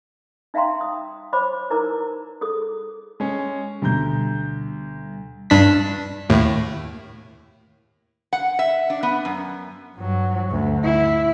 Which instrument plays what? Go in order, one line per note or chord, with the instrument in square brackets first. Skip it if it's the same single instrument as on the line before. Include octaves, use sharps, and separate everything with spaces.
[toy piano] D#4 E5 F5 G5 A#5 C6
D#6
C5 C#5 B5 D6
D#4 E4 A#4 B4 A#5 D6
G#4 A4 D#6
[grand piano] G#3 C#4
[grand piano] D2 A#5 G6 [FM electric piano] B2 G3
[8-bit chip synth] G2 D4 B6
D#2 A2
[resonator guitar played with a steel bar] F#5
E5
D4
B3
F#2
[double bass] G2 F#3
D2
E4